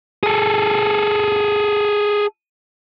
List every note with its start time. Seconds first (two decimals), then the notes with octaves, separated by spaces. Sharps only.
0.23 G#4 A4